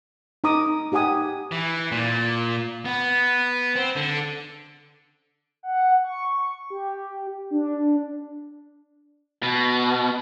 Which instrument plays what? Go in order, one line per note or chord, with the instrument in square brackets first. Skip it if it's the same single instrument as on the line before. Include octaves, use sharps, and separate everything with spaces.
[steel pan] D#4 A#5 D6 D#6
D#4 G4 F#5 G#5 D#6
[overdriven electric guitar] E3
A#2
B3
C4
D3
[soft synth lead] F#5
C#6
G4
D4
[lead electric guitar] B2